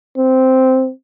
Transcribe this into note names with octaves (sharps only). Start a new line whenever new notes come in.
C4